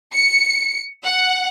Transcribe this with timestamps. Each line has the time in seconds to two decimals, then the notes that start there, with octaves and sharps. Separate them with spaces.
0.14 C#7
1.05 F#5